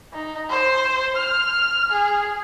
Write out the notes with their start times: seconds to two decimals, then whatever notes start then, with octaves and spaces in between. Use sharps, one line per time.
0.13 D#4
0.50 C5
1.16 F6
1.91 G#4